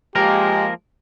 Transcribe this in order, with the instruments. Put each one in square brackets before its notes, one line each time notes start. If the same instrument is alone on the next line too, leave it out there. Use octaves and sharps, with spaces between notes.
[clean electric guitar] F3 A#3 A#4 [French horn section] G#3 [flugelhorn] G4